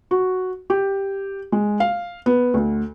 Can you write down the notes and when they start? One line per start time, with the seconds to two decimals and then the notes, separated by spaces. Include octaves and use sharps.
0.11 F#4
0.70 G4
1.52 G#3
1.80 F5
2.26 B3
2.54 D2